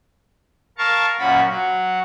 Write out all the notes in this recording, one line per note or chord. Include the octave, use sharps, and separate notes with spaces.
A#4 F5 A5 C#6
F#2 A#2 C#4 F#4 F#5 B5
F#3 F#4